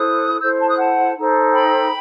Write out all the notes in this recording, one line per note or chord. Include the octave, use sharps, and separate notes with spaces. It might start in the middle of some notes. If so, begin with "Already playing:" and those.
Already playing: E4 A4 C5 D#6 F#6
E4 A4 C5 E6 G6
A5 C6
D#6 F#6
F#5 A5
D#4 A4 C5
G5 B5